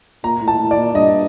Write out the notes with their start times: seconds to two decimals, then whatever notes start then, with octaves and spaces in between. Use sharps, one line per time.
0.24 A#2 A#5
0.41 A2
0.48 A5
0.59 A2
0.71 D5
0.77 A#2
0.94 G2 D#5